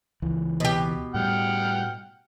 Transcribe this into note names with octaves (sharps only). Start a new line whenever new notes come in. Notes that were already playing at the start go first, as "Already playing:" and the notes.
C#2 E3
B2 G4
A2 G3 F#5 G5 F6